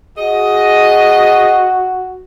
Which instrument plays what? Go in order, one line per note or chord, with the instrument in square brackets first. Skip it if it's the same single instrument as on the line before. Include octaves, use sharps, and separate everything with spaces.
[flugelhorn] F#4 [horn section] G#4 D#5